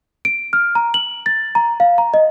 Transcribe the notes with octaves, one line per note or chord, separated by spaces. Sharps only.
D7
F6
A#5
F#7
A6
A#5
F5
A#5
D#5